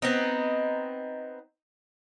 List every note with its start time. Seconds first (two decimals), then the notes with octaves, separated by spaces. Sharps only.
0.02 B3 C4 D#4